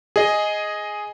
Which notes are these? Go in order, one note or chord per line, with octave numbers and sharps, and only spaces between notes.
G#4 D#5